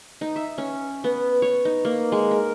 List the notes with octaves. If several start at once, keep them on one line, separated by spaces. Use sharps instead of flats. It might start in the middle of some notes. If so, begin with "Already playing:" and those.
D#4
E5
C#4
B3
C#5
D#4
A#3
G#3
A#4